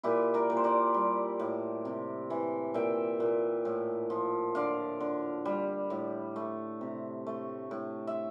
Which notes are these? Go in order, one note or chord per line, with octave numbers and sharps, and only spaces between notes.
A#2 E4 G4
A#4 D5
A#2
C5
A#4 D5
G3
A2
C3
E3
A#2 E5 G5
A#2
A2
F3
D3 D5 F5
D3
G3
A2
A3
C3
A3
A2
E5